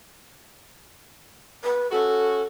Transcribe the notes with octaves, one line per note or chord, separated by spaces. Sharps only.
B4
C#4 F#4 A4